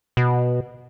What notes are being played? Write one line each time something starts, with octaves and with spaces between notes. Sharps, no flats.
B2